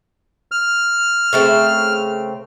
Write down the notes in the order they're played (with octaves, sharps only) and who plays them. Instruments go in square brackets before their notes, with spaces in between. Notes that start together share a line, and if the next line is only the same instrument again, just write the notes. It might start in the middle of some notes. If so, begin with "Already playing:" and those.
[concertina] F6
[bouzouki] C#3 A3 C4